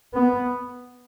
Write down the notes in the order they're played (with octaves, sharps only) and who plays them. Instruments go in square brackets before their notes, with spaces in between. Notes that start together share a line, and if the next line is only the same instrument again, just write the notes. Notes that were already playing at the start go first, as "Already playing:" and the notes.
[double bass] B3